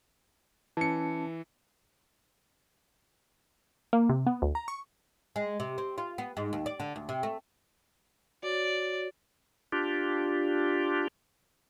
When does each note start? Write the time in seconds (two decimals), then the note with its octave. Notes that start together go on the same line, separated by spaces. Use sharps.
0.77 E3 C#4 A5 C#7
3.93 A#3
4.09 C3
4.26 B3
4.42 D2
4.55 A#5
4.68 C#6
5.36 G#3
5.60 C3
5.78 C4
5.98 F4
6.18 B3
6.37 G#2
6.53 D#2
6.66 D5
6.80 D3
6.96 D2
7.09 C3
7.23 A3
8.43 F#4 C#5 D5
9.72 D4 F4 G4